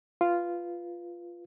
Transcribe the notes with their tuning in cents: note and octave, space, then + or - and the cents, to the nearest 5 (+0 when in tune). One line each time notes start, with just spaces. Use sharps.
F4 -5 B4 +0